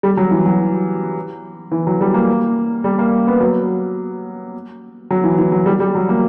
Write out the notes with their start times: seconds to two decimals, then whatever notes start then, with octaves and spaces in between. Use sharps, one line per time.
0.03 G3
0.17 F#3
0.31 E3
0.46 F#3
1.71 E3
1.87 F#3
2.01 G3
2.14 A#3
2.84 G3
2.99 A#3
3.27 B3
3.41 F#3
5.11 F#3
5.24 E3
5.38 E3
5.52 F#3
5.66 G3
5.80 G3
5.95 F#3
6.09 A#3